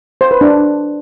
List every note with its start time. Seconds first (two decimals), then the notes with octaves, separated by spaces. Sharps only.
0.21 C5
0.31 B4
0.41 D4